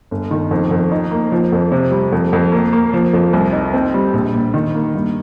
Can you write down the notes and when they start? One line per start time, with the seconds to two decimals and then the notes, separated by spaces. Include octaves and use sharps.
0.11 G1
0.31 D#3
0.51 F2
0.71 F2
0.92 D#4
1.11 A#3
1.32 F3
1.52 F2
1.72 C3
1.92 G3
2.12 F2
2.33 F2
2.52 A#3
2.73 A#3
2.93 F3
3.13 F2
3.33 C2
3.53 D#4
3.74 C4
3.94 G3
4.14 A#1
4.34 A#1
4.54 D#3
4.74 A#3
4.95 G2